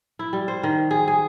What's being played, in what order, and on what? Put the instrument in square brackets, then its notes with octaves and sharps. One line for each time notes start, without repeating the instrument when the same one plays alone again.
[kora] E4
G3
C5
D#3
G#4
G#4